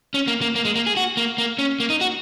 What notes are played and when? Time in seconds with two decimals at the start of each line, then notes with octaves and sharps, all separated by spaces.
0.14 C#4
0.27 A#3
0.41 A#3
0.55 A#3
0.65 G#3
0.75 A#3
0.87 G#4
0.97 F#4
1.17 A#3
1.38 A#3
1.59 C#4
1.80 A#3
1.90 D#4
2.01 F#4